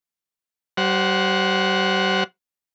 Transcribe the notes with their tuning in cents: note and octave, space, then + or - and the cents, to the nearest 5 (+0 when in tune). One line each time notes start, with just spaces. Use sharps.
G3 -40 C5 +0 F#5 -15